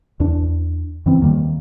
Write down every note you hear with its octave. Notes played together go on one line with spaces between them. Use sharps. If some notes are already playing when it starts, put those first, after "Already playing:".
E2 D4
F#2 E3 C4
D#2 D#3 G3 A#3